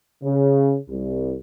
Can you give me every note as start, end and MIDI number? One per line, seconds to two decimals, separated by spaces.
0.23 0.76 49
0.89 1.35 36